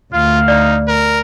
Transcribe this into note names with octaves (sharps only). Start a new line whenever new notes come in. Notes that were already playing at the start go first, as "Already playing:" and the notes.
D2 F4 F5
D#4 D5
A#4